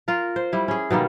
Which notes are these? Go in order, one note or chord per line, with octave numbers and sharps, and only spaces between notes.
F4 A#4
C5
G3 E4
C#4 G#4
B2 D#3 G3 A#3